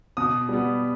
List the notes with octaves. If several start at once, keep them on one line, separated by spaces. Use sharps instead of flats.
B2 D#6
G3 B3